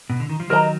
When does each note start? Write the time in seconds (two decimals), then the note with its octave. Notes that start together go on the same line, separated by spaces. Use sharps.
0.10 B2
0.20 D3
0.29 D#3
0.40 F3
0.50 D#3 F#3 A#4 D#5 A#5